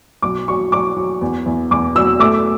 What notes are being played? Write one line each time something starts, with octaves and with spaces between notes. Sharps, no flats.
B1 D6
F#3 C#6
F#3 D6
F#3
E2
E2
E2 D6
F#3 E6
A3 D6